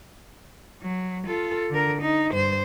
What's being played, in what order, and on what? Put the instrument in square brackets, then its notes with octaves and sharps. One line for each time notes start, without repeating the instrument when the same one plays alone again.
[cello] F#3
F4 A4
D3 A#4
D#4
G2 C5